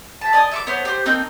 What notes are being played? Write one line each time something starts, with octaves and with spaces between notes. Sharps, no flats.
E5 A5
D5 D#5 G#5 D#6
E5 C#6 D6
B3 C5 C#5
G4 C5
A#3 C4 D#4 G6